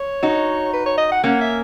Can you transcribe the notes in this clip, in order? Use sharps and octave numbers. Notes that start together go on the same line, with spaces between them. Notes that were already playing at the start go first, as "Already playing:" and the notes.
Already playing: C#5
D#4 F#4
B4
C#5
D#5
F#5
A#3 C#4 F#5
E5